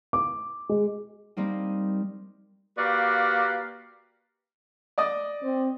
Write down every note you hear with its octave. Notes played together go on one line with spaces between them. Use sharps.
D6
G#3
G3 A#3 C4 D#4
A#3 F#4 G4 B4 D5 F5
D5 D#5 D#6
C4